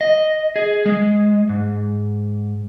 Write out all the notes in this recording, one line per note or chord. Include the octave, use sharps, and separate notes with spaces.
D#5
G#4
G#3
G#2